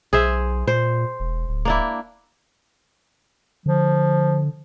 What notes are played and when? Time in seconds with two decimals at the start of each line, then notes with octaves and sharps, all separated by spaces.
0.13 B1 G#4 C5 E5
0.68 A#2 C5
1.20 E1
1.49 D1
1.65 A#3 D4 E4
3.66 D3 F3